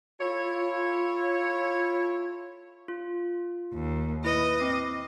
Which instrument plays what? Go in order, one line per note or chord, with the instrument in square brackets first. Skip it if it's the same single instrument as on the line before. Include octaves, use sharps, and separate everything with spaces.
[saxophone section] E4 A4 C#5 [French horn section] F4
[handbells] F4
[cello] D#2
[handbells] E4 B4 [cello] D#5
[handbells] C4 D6 C7